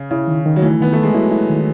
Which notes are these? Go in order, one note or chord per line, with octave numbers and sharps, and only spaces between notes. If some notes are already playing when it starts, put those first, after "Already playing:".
Already playing: C#3
C#3 E4
D#3
D#3
F#3
E3 A3
D#3 B3
A3 E4
G#3
F#3 E4
E4
D#3